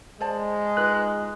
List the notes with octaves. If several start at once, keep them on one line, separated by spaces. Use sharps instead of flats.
G#3 C5 D5 A5
D#4 F4 B4 F#6